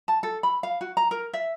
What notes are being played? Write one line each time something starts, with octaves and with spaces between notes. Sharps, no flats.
A5
A4
B5
F5
F#4
A#5
A#4
E5